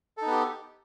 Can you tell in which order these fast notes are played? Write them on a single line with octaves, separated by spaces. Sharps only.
A4 D#4 B3 G4